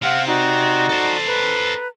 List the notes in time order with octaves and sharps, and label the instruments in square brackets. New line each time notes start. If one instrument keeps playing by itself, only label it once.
[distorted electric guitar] C3 C4 [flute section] F5 F#5 F6
[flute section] D#4 F#4 D5
[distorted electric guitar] A4 C5
[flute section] B4 A#5